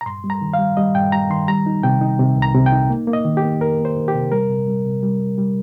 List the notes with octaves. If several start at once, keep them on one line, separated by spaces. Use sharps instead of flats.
A#5
G2 C6
G3
A#5
D#3
F5
G3
G3 D#5
G2 G5
G3 A#5
D#3 C6
G3 A#5
D#4
C3 G5
D#4
C3
C2
A#5
C3
G5
D#4
A#3
A#3
D#5
D#3
G4
A#3
F2 A#4
A#3
C5
D#3
G4
C3
G3 A#4
C3
G3
C3
G3
G3
G3